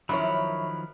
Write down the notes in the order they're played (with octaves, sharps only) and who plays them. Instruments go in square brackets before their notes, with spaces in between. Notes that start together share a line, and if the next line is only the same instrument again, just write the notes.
[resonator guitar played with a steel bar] F#2 E4 C#5 [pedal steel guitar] D#3 F3 F#3 [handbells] B5